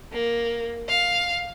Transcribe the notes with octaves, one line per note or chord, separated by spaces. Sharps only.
A#3
F5